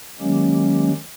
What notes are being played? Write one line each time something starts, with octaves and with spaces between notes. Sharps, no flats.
D#3 F#3 G#3 A#3 C#4 G4